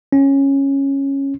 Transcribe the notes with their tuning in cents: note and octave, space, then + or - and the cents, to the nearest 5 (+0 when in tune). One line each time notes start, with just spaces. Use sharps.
C#4 -10